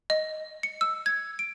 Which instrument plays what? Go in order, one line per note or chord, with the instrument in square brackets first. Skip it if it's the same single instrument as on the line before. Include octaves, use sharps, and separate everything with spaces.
[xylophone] D#5
C#7
E6
G#6
D7